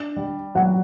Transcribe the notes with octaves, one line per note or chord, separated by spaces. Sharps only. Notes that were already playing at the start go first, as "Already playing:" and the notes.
Already playing: D4
G3
F#3 F#5